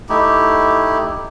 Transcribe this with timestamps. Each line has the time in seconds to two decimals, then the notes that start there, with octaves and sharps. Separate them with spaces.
0.09 A3 D#4 E4 G4